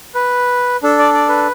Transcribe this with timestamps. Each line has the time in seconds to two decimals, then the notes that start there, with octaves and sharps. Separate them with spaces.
0.15 B4
0.83 D4 A4
0.99 D5
1.14 D5
1.29 B4